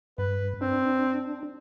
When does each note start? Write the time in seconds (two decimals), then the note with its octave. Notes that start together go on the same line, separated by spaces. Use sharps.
0.18 G2 B4
0.61 C4 D4